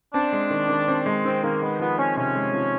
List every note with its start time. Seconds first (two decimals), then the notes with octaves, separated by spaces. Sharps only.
0.14 C4 D4
0.32 G#3
0.50 D#3
0.69 D#3
0.88 C4
1.06 G#3
1.25 D#3 C4
1.43 D#3 A#3
1.62 G#3 B3
1.79 F3 B3
1.98 C4 C#4
2.16 C3 C#4
2.35 G#3
2.54 F3